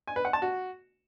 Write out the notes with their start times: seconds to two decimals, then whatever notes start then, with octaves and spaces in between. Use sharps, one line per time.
0.07 G#5
0.16 B4
0.25 F#5
0.33 A5
0.42 F#4